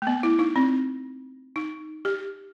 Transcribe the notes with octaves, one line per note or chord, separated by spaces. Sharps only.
A3
B3
E4
D#4
C4
D#4
G4